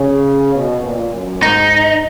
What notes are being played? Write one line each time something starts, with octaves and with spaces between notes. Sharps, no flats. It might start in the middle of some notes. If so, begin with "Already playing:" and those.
Already playing: C#3
B2
A#2
F#2
G#2 D#4